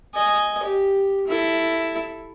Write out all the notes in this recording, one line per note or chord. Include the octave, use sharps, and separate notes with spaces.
D#5 G#5
G4
E4 A4